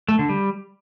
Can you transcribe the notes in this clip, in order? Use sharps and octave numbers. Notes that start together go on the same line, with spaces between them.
A3
D3
G3